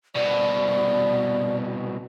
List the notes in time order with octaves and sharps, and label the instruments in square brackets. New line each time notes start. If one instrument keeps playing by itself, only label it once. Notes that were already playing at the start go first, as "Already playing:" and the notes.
[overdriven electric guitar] C2 B2 [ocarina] D5